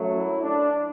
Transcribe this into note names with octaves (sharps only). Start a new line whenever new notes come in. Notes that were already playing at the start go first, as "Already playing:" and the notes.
Already playing: F#2 F#3 A3
E4
D4